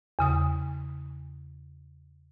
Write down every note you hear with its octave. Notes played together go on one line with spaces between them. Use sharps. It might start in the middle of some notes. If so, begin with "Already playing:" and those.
E2 C#3 D#6